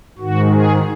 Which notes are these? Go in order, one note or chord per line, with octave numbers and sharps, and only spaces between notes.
G#2 D#3 F#4
G#4